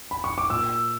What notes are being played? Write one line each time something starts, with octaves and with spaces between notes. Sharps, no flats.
B5
C#6
D6
A#2 E6